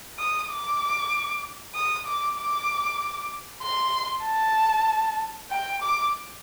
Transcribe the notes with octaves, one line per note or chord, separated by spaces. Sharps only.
D#6
D6
D#6
D6
D6
C6
A5
G5
D6